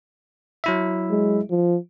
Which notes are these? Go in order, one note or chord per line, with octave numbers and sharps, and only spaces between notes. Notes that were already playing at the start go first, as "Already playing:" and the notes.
F#3 E4 E5
G#3
F3